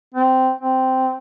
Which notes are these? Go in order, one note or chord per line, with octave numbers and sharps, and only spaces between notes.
C4
C4